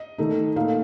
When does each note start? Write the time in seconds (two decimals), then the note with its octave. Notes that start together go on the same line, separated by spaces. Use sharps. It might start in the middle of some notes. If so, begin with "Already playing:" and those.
Already playing: D#5
0.18 D#3 A3 D#4
0.56 A#2 A3 D#4 F5